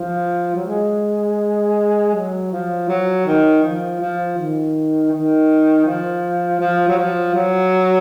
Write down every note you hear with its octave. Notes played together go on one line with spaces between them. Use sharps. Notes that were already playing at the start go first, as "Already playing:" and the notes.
Already playing: F3
F#3
G#3
F#3
F3
F#3
D#3
F3
F3
D#3
D#3
F3
F3
F#3
F3
F#3